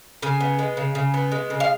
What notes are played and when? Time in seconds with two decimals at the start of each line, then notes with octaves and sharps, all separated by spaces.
0.22 C#3 G#5
0.40 B3
0.59 G#3
0.77 C#3
0.95 C#3
1.14 B3
1.32 G#3
1.50 C#3
1.60 F5